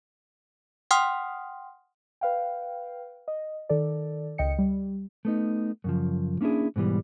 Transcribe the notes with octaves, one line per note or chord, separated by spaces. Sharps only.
F#5 G5 C6 D#6 F6
B4 F5 G5
D#5
D#3 A4 D5
C#2 D#5 G5 C#7
G3
A3 B3 D#4
F#2 C#3 F3
A#3 C#4 D4 E4 G#4
G#2 B2 E3 G3